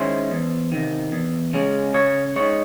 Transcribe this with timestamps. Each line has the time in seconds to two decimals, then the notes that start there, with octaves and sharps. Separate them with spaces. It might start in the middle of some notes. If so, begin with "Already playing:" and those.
Already playing: D#3 G#3 C#4 E4 C5
0.31 E2
0.72 C3 D#3
1.12 E2
1.53 C#3 G#3 C#4
1.94 C#3 C#5
2.36 G#3 D#4 C#5